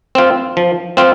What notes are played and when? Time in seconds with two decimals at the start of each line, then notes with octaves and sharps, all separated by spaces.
0.15 C4 F4
0.57 F3
0.97 C4 F4